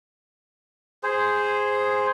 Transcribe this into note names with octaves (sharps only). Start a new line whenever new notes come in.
G#4 C5